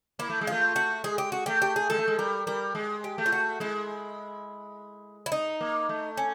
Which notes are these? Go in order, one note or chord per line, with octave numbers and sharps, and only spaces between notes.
A#3 E4
A3
G#3
A3 F4
F#4
G#3 G#4
G4
F#4
A3 G4
G4
G#4
G#3 A4
A3
G#3
G3 A#4
G3 A#4
G#3
G4
A3
F4
F#4
G#3 E4
E4
D#4
A#3
A3
C#4